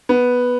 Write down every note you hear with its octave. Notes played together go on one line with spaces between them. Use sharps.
B3